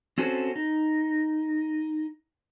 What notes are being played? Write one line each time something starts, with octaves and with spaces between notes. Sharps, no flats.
C4 C#4 F#4 A4 C5
D#4